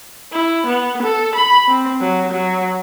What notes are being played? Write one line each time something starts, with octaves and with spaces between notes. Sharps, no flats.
E4
B3
A4
B5
C4
F#3
F#3